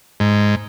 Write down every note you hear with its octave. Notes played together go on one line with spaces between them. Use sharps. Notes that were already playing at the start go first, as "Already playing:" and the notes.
G#2